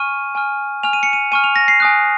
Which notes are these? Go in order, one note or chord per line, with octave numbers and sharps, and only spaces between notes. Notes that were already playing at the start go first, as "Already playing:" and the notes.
Already playing: G#5 C#6 F6 D#7
G#5 C#6 F6
G#5 C#6 F6 F7
D#7
C#7
D#7
G#5 C#6 F6 D#7
F7
A#6
C7
G#5 D#6 F#6